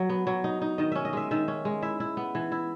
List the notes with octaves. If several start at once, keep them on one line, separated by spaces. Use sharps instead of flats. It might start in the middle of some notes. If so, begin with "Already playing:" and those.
Already playing: F#3
B3
F#3
D#4
D#4
D#3 D#5
C#4 E5
D#5
G#3 E5
D#3 E5
C#4
G#3
E4 E5
E4
B3
E3
E4